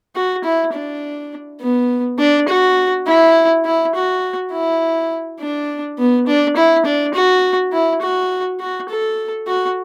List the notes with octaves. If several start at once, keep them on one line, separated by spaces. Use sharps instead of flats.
F#4
E4
D4
B3
D4
F#4
E4
E4
F#4
E4
D4
B3
D4
E4
D4
F#4
E4
F#4
F#4
A4
F#4